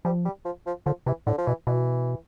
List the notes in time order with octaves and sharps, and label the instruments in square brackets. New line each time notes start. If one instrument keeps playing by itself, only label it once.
[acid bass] F3 [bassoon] G3
[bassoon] G3
F3
F3
[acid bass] D3 [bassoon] F3
[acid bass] C3 [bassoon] E3
[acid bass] A2 [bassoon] D3
[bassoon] F3
[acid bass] B2 [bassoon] E3
[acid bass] B2 [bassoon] E3